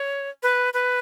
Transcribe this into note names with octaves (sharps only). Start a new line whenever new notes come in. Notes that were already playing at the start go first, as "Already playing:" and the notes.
Already playing: C#5
B4
B4